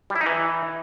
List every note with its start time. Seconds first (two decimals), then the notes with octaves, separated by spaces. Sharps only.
0.10 G3
0.16 E4
0.21 D#4
0.26 E3